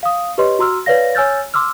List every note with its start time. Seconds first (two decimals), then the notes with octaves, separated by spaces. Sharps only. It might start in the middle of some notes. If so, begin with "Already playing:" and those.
0.03 F5 D#6
0.38 G4 B4 C#5 D#5 C6
0.59 F#4 A#5 C6 E6 F6
0.86 B4 C#5 D5 F5 A#6
1.15 C#5 G#5 E6 F6 G6 A6
1.54 C6 D6 E6 F6